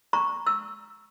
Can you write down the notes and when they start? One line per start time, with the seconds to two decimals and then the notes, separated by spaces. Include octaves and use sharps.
0.13 A#5 C#6
0.47 E6